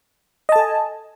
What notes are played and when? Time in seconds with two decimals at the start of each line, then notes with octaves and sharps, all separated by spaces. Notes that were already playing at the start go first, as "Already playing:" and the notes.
0.49 D#5
0.52 A5
0.56 A4
0.59 G#5